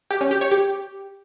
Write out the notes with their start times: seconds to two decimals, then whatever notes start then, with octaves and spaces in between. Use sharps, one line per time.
0.11 G4
0.21 C#4
0.31 G4
0.41 C#5
0.51 G4